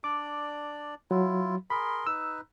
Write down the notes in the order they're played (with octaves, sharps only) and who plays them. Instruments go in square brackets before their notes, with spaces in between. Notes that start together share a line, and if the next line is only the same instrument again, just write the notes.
[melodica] D4 D5 [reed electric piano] D6
[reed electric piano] F#3 [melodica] E4 F4
[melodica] G#4 A#4 C6 [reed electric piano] B5
[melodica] D#4 B4 [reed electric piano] E6